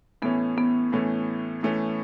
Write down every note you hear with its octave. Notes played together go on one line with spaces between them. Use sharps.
A2 E3 A3 B3 C#4
B3
A2 E3 A3 C#4
A2 E3 A3 C#4